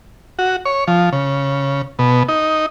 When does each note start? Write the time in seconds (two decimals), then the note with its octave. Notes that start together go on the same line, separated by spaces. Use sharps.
0.39 F#4
0.65 C#5
0.87 F3
1.13 C#3
1.99 B2
2.29 D#4